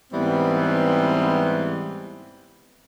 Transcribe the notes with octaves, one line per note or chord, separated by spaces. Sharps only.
G#2 E3 G3 B3 C4